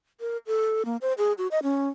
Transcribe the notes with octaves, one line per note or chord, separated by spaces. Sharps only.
A#4
A4
A#3
C5
G#4
F#4
D#5
C#4